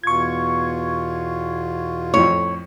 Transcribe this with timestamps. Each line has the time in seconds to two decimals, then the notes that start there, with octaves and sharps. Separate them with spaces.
0.03 E2 B2 F4 C#6 G#6
2.14 F2 A2 C#5